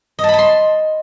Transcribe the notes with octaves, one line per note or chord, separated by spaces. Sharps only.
D#5
A5
B5
A5
C6